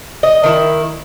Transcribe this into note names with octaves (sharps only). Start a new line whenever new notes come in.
D#5
D#3 E4